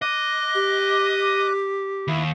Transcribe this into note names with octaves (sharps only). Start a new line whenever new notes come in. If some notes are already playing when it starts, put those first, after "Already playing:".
D#5 D6 F#6
G4
D#2 E4